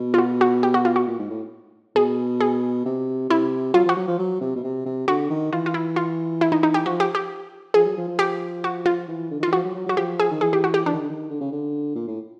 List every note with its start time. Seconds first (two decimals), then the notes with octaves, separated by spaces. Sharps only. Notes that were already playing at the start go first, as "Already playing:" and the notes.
Already playing: B2
0.14 F4
0.18 F#4
0.41 F#4
0.63 G4
0.74 F#4
0.85 F4
0.96 F#4
1.08 A#2
1.19 G#2
1.30 A2
1.96 B2 G#4
2.41 G#4
2.85 C3
3.30 C3 E4
3.74 F#3 F4
3.86 F3 F#4
3.97 F#3
4.07 F3
4.18 F#3
4.41 C3
4.56 B2
4.63 C3
4.86 C3
5.08 D3 F#4
5.30 D#3
5.52 E3 F4
5.66 F4
5.74 E4
5.96 F4
6.41 E4
6.52 D#4
6.63 D#4
6.74 G4
6.86 F3 F#4
7.00 G4
7.15 G4
7.74 F3 G#4
7.86 F#3
7.97 F3
8.08 F3
8.19 G4
8.64 F#4
8.86 F4
9.08 E3
9.31 D3
9.39 D#3
9.43 E3 F4
9.53 F3 F#4
9.64 F#3
9.74 F#3
9.86 F#3 F#4
9.97 F3 G4
10.20 G#4
10.31 D#3
10.41 E3 G#4
10.53 G4
10.64 F#4
10.74 G4
10.86 E3 D4
10.94 D#3
11.01 D3
11.09 D#3
11.30 D3
11.41 C#3
11.52 D3
11.95 A#2
12.07 A2